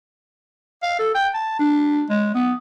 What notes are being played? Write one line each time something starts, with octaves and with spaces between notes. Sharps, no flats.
F5
A4
G5
A5
D4
G#3
B3